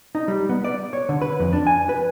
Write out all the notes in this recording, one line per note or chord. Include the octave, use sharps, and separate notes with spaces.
D#4
G3
B3
D5
C#5
D3
B4
F2
D4
G#5
B4